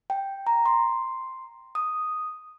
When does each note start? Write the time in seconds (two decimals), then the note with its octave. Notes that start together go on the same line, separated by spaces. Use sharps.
0.10 G5
0.47 A#5
0.66 C6
1.75 D#6